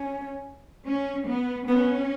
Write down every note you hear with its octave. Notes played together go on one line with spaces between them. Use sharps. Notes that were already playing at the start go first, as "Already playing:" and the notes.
Already playing: C#4
C#4
B3
B3 C#4